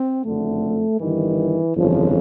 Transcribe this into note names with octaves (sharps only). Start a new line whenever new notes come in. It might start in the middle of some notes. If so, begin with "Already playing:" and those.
Already playing: C4
F#1 F2 D3 A3
G1 G2 D#3 E3
G1 F2 C#3 E3 F3